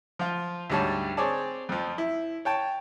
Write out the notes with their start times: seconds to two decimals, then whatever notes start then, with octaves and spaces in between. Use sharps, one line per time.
0.19 F3 F4
0.70 D2 G#2 G3 C#5 A5
1.17 C4 G#4 C#5 D5 A5
1.69 F2 F3
1.98 E4
2.45 C#5 G5 A5